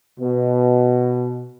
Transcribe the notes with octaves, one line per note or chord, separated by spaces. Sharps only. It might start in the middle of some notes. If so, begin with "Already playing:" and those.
B2